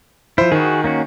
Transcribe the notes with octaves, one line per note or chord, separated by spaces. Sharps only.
F3 E4 C5
D#3 F#4 G#4
A#3 C#4 F#4